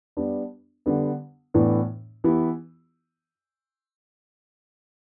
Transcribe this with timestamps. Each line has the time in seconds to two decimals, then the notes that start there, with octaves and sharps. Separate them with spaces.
0.17 G3 B3 D4
0.86 D3 G3 B3
1.54 A2 E3 B3 D4
2.24 E3 B3 E4 G4